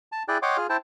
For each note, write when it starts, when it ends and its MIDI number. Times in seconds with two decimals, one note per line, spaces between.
0.12 0.23 81
0.28 0.38 64
0.28 0.38 68
0.28 0.38 74
0.28 0.38 79
0.28 0.38 90
0.42 0.57 73
0.42 0.57 75
0.42 0.57 78
0.42 0.57 79
0.42 0.57 84
0.42 0.57 86
0.57 0.67 65
0.57 0.67 68
0.57 0.67 89
0.69 0.77 64
0.69 0.77 72
0.69 0.77 79
0.69 0.77 81